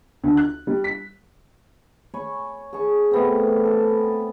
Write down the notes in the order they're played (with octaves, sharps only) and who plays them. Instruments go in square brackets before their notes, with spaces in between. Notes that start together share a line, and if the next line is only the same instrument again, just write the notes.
[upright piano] D2
F#6
G3
B6
[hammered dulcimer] C#5 G#5 B5 C#6
G#4 A5 C#6
A3 B3 C4
A4